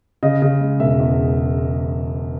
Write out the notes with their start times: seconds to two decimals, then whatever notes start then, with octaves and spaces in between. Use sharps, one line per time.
0.23 C#3 D#5
0.42 C#3
0.61 G#3
0.80 E1 E5
1.00 E2